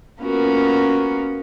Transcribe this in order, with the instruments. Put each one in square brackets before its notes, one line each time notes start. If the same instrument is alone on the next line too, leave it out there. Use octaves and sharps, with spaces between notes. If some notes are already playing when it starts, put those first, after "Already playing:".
[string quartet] A#3 B3 C#4 F4 F#4 A#4